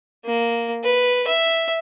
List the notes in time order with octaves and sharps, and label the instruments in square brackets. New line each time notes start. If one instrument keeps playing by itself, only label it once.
[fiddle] A#3
B4
E5